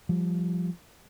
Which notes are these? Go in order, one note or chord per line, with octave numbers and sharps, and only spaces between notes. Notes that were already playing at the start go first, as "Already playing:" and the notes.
F3 G3